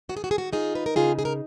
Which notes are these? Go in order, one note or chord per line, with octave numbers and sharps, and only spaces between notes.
D#3 F#4
G#4
F#4
G#4
F#4
D#4 F4 G#4
B4
A#4
C#3 F4 G#4
G#4
A#4